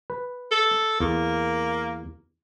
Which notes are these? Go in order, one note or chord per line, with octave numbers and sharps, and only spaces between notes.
B4
A4
E2 A#3